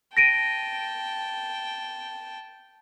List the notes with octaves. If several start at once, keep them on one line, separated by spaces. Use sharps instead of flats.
G5 A5 A#6 D7 D#7